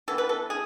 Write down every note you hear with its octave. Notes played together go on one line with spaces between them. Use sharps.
E3 B3 A4
B4
A4
G#4